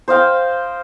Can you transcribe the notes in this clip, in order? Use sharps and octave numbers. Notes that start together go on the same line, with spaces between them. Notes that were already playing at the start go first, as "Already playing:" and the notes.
C5 D#5 F5 G5